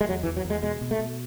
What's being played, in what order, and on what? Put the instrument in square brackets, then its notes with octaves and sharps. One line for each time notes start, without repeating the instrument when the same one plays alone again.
[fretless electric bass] G#3
E2 F#3
E3
E2
F#3
E2
G#3
B2 G#3
B2
A3
B2